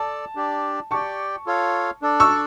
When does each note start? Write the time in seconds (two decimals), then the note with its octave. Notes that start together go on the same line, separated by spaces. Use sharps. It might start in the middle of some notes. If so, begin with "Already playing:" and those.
Already playing: A4 D5 A5
0.35 D4 G4 D5
0.91 G4 D5 G5 A5 C#6
1.46 F4 A4 C#5 F5
2.02 D4 A4 D5
2.20 C#6 E6